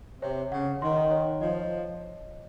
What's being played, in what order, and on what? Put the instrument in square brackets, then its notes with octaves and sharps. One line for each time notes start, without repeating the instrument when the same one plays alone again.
[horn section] C3 [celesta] C#5
[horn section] C#3 [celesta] F#5
[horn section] D#3 [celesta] C6
[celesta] C#5
[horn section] F3 [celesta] D#5